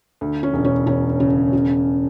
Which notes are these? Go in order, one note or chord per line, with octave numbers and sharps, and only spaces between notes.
D2
C#4
E1
C#4
E1 C#4
C#3
C#3